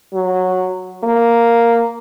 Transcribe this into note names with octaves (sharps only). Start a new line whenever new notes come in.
F#3
A#3